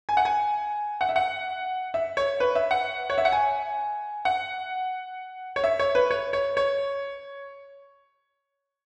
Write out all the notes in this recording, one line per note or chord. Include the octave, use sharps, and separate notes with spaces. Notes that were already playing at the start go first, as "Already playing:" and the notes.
G#5
F#5
G#5
F#5
E5
F#5
E5
C#5
B4
E5
F#5
C#5
E5
F#5
G#5
F#5
C#5
E5
C#5
B4
C#5
C#5
C#5